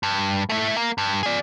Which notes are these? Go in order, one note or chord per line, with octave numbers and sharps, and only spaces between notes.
G2
A3 E4
A#3
G2
G#4 D5